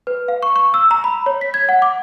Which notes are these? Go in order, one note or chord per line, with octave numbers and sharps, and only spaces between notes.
B4
F5
C#6
C#6
E6
A#5
B5
C#5
B6
G#6
F#5
D6